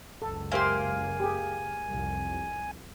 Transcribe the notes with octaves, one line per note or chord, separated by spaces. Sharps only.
F#1 C#2 A4
A#3 G4 C5 E5 G#5 C6
G4 G#4
C2 F2